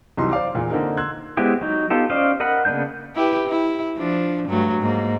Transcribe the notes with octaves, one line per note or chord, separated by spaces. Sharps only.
C2 E3 F#3 D#4 G4 C6
C5 D5 F5 D6
E2 A#2
D3 A#3 C4 D#4 A#4
C6 E6 F#6 G#6
G#3 B3 C4 E4 G4
F#3 D#4
B3 D#4 F4 G4 A4
C#4 C5 D5 D#5 F5
A#4 D#5 F#5 B5
C#3 A#3 B3 D4 G6
E4 G4 B4
E4
F3 D4
G2 F#3 A3
G#2 A#3